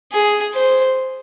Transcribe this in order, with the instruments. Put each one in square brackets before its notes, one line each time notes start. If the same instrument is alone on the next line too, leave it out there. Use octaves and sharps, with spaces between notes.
[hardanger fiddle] G#4
C5